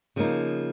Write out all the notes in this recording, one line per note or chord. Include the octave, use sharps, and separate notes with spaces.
C#3 F3 A#3 D#4